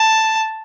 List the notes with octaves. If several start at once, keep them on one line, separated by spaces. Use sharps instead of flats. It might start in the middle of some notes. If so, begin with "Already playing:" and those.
Already playing: A5